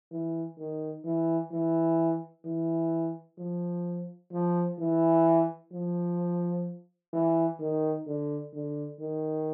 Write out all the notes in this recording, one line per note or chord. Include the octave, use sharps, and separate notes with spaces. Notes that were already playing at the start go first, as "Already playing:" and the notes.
E3
D#3
E3
E3
E3
F3
F3
E3
F3
E3
D#3
D3
D3
D#3